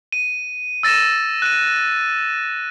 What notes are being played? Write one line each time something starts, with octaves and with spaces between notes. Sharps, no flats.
D#7
E6 A6 A#6 D#7 E7
F#6 D#7